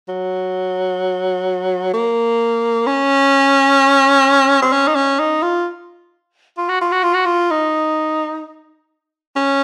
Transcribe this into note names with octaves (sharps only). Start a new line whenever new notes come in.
F#3
A#3
C#4
C4
C#4
D#4
C#4
D#4
F4
F4
F#4
F4
F#4
F4
F#4
F4
D#4
C#4